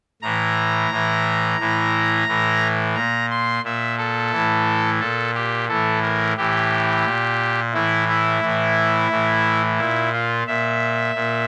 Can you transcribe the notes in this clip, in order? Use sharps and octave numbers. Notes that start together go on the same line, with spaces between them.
A2 E3 A#5
A2 E3
A2 E3
A2 E3
A#2 A#5
C6
A#2 E5
A4
A2 E3
A#2 A4
G4
A2 E3 A4
A#4
A2 E3 G4
A#2
A2 E3 E4
E4
A2 E3
A2 E3
A#2 E4
F4
A#2 E5
A#2